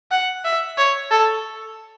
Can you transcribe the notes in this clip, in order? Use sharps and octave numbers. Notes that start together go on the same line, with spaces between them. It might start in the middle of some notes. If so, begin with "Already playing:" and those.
F#5
E5
C#5
A4